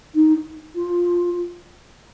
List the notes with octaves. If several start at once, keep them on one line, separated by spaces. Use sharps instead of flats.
D#4
F4